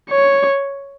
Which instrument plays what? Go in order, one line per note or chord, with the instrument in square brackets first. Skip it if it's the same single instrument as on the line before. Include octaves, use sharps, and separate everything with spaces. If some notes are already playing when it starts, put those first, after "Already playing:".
[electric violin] C#5